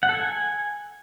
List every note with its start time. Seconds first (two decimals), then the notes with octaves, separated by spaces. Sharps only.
0.03 F#5
0.09 A4
0.15 G#5